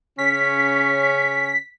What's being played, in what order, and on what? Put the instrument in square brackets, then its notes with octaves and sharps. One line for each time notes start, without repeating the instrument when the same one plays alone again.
[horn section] C#3 C#4 [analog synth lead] B6